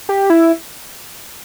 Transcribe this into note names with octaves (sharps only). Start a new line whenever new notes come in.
G4
E4